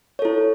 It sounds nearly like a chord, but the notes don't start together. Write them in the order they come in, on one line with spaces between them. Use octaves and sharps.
C#5 A4 E4